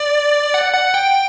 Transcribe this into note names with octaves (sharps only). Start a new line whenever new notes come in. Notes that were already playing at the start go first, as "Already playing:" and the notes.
Already playing: D5
F#5
F#5
G5